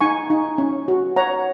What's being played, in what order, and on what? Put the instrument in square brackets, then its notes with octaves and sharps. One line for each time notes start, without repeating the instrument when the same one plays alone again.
[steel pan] D#4 G#5 C#6
D#4
C#4
F#4
C#5 F#5 A#5